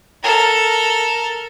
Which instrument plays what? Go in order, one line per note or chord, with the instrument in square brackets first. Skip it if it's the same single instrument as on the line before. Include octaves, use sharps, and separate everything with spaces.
[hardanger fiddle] A4 A#4